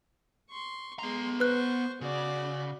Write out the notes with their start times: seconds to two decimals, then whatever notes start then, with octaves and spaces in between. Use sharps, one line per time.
0.50 C6 C#6
0.99 G#3 B3 A#5 C6
1.40 B4 C5 C#6 F#6
2.01 C#3 F#4 D5